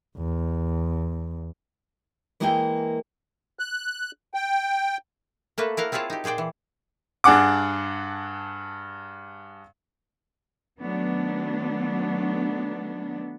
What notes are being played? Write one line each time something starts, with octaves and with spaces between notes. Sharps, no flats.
E2
E3 G#3 A#3 E4 G#4 G5
F#6
G5
A3 A#3 A4 B4
E4 A#4 F5 F#5
C4 E4 F4 G#4 C#5 A5
D#4 G4
A#2 G#4 C5 D5 G5
E3
G2 D4 G#4 F#5 D6
D#3 F#3 A3 B3 D4